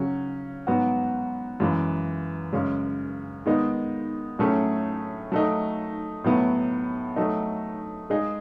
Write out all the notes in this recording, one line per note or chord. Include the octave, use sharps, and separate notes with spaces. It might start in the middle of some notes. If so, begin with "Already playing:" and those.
Already playing: C#3 F#3 C#4
G#2 F#3 B3 F#4
F#2 E3 G#3
F#2 C#3 G#3 C#4
D#3 G#3 B3 D#4
A2 F#3 A3 C#4 G#4
F#3 A3 D#4
A2 F#3 B3
F#3 A3 D#4
G#3 D#4 G#4